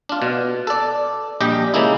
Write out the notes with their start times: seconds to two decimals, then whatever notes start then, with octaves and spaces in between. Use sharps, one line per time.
0.09 D4 F4
0.22 B2
0.67 A4 D5
1.41 A#1 G3 G4 D#5 G5
1.74 C#3 G#3 A#3 D#4 E4